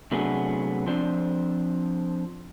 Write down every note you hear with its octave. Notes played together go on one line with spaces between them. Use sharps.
C3 F#3 A3 B3 D4 G#4
F3 C4 D4